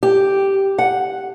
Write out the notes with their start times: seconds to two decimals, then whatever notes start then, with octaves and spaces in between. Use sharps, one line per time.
0.03 G4
0.79 F#5